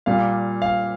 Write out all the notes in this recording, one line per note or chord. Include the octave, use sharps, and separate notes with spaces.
A#2 G3 A#3 F5
F5